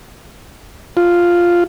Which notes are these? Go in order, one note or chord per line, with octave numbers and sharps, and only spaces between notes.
F4